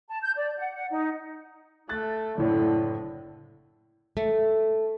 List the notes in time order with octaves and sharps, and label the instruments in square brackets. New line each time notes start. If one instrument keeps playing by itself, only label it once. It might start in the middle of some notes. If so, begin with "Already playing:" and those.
[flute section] A5
G6
D5
F#5
F#5
D#4
[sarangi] A3 [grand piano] F#6 A6
[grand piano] F#1 A2 [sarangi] D3 [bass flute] E4
[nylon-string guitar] A3